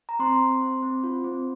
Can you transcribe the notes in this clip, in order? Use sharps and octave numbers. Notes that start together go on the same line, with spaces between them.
A#5
C4 C6
C4
C4
C4
F4
C4